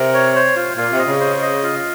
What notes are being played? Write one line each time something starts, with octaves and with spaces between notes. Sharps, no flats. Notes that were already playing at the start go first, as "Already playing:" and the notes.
Already playing: C3 A#4
C#5
C5
F4
A#2 F4
C3
D#5
C#3
C5
D#5
F4